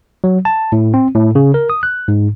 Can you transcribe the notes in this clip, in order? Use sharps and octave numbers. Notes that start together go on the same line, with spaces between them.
F#3
A5
A2
C4
A2
C#3
A#4
D#6
F#6
G#2